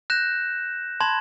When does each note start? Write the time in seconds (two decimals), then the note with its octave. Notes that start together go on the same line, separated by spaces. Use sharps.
0.10 F#6 G6 A#6 E7
1.01 A5 B5 C6 G#6 E7